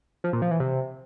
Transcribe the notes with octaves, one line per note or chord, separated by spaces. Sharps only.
F3
A#2
F3
E3
C3